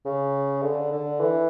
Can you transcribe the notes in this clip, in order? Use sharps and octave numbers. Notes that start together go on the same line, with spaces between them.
C#3
D3
D3
E3